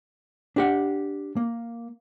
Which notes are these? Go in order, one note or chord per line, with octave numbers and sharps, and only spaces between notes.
D4 G4 F#5
A#3